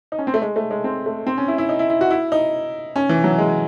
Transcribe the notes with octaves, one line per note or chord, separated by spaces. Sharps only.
D#4
C#4
C4
A3
G#3
A3
G#3
C4
A3
C4
C#4
E4
E4
D#4
E4
E4
F#4
E4
D#4
C#4
E3
F#3
G#3